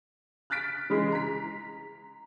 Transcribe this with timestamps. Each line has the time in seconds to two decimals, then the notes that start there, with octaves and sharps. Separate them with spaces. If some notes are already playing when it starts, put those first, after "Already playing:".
0.50 F6 F#6 A6 B6 D7
0.90 C#3 E3 G#3
1.12 A#5 B6